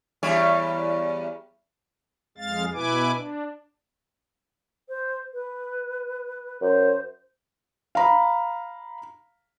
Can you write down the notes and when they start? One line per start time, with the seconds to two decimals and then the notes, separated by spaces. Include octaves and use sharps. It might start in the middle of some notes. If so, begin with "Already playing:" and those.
0.23 E2 G3 C#5
2.38 F2 G#3 F5 A6
2.73 B2 E4 B4 G#5 D6
3.15 D4
4.89 C5
5.34 B4
6.62 F#2 C5
7.95 F5 A#5 B5